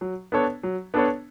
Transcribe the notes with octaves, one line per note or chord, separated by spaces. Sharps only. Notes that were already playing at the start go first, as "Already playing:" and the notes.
F#3
B3 D4 A4 C#5
F#3
B3 D4 A4 C#5